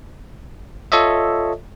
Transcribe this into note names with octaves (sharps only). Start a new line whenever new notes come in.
F4 A4 C#5 D#5 E5